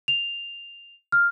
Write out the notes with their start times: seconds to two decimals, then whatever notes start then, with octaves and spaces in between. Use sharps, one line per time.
0.08 F7
1.12 F6